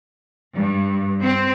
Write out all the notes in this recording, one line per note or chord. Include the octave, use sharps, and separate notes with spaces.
G2
C4